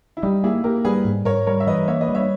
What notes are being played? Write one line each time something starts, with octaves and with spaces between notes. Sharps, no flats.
E4
G3 D#4 G4
A#3 E4 G#4
A#3 G4 A#4
G3 G#4 B4
G#2
G#2 A#4 C#5
G3 A#4 C#5
E5
E3 B4 D#5
A#3 C#5 E5
B4 D#5
G3
C#5 E5